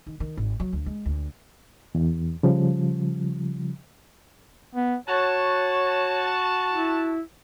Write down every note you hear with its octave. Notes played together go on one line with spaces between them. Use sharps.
D#3
D#3
G#1
F#3
D2
G#3
D2
E2
C#3 F3 G3
B3
F#4 C#5 A5
E4